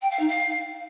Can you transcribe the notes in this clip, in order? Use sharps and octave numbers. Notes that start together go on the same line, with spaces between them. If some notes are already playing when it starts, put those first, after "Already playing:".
G5
F5
D#4
F5